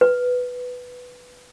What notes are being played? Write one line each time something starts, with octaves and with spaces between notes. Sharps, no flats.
B4